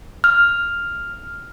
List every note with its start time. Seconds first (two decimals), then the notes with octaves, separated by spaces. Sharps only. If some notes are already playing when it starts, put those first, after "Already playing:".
0.24 F6